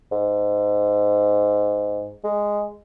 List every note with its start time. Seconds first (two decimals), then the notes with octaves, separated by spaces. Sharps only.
0.12 G#2
2.24 G#3